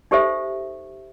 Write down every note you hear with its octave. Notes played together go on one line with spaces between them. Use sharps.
D#4 G4 A4 C5 E5